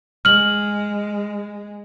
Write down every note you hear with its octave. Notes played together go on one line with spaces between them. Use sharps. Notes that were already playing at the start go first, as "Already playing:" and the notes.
G#3 F6 F#7